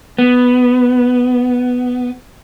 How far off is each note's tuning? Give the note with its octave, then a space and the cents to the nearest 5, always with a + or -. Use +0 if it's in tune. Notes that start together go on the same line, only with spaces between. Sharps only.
B3 +5